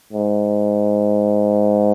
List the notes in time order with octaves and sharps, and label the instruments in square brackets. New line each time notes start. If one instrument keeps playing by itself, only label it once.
[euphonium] G#2